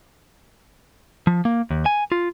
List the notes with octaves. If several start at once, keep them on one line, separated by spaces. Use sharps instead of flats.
F3
A#3
D#2
G#5
F4